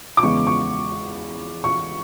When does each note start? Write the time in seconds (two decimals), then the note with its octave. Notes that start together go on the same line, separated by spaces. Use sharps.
0.17 D6
0.23 E2 C#3 G#3 B3 C#6
0.47 C#6
1.64 C#6